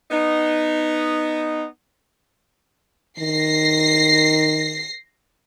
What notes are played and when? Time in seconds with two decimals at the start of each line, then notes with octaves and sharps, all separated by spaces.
0.11 B3 D#4
3.19 D#3 A#6 C7